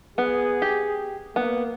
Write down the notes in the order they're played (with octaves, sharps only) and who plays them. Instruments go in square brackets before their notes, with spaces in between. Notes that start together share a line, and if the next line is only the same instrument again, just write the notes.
[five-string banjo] B3 [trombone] G#4
[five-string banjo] G4
[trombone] A#3 [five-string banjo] B3